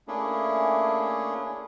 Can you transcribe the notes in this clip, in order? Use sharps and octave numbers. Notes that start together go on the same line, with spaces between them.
A3 A#3 C#4 D4 E4 G#4